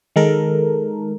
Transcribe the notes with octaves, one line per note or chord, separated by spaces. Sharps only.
D#3 G#3 A4 A#4